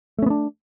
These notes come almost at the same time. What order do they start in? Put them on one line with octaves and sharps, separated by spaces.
A3 C#4 B3 D4